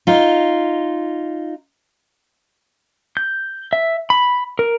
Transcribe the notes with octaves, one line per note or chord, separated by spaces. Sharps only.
D#4 F4
G6
E5
B5
A#4